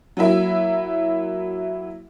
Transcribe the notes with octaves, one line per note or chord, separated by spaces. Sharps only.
F#3 A#3 E4 E5